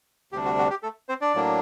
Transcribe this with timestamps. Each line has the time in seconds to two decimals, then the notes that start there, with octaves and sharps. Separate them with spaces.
0.32 D2 C3 G3 D4 G4
0.45 F#4
0.59 F#4
0.70 G4
0.83 A3 A4
1.09 C4 C5
1.21 D4 D5
1.34 A2 F#3 A#3 D4